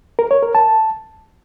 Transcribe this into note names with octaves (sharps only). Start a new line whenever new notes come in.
A#4
C#5
A#4
A5